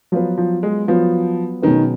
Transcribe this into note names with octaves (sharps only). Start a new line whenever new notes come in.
F3 F#3 B3 F4 B4
F3
G#3
F3 F#3 B3 F4 B4
B2 D#3 F#3 C#4 G#4 B4